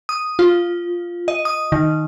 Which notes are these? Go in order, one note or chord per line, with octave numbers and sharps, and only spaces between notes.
D#6
F4
D#5
D#6
D#3